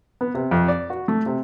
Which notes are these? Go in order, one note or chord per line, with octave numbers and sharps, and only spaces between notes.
B3
C3
F2
D5
F#4
A3
C3